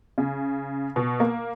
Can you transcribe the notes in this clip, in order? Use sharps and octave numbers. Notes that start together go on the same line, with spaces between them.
C#3
B2
A#3